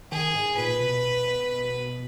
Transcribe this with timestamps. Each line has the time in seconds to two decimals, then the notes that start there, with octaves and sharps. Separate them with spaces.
0.12 D#3 G#4
0.35 G#2
0.57 A#2 B4
0.80 B2